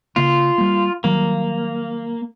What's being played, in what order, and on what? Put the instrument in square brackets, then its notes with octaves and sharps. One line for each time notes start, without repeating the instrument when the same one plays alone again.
[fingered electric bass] C#3 A#3 [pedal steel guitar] F4
[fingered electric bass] G3 A#3
[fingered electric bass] D#3 F#3 G3 [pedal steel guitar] A#3